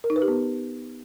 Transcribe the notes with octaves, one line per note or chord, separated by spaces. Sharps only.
A#4
D#4
B4
G4
B3